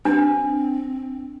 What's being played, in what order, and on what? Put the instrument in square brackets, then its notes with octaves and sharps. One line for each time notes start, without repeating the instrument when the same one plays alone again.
[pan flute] C4 [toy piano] D4